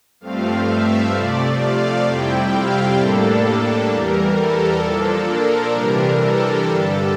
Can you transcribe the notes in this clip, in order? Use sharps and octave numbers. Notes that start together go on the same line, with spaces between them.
G2 F3 A3 C4 F5
E5
C3 F3 A3 D5
F5
F2 C3 G3 C4 E4 G5
F5
A2 G3 A#3 D4 A4
E2 E3 G3 A#4
A4
A#2 F3 A#3 D4 A4
A#4
C3 E3 G3 D4 A#4
A4
G2 D3 G3